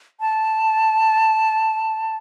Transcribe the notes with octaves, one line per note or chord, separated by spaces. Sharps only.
A5